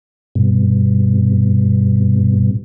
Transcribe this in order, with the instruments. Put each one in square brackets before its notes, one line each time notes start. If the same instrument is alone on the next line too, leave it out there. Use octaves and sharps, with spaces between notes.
[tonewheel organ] G2 B2